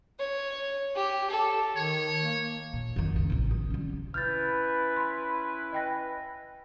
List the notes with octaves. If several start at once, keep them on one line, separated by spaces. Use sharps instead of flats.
C#5
G4
A4
D#3 C#5
A#3
A#2
F#2 D#3
C#2 F#2
A1 C3
D#3
C2 C#4
C#4 E4 B4 F6 G6 A6
B5 C6
D#5 G5 A#6